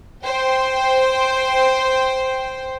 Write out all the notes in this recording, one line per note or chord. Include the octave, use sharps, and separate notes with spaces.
C5 G5 C6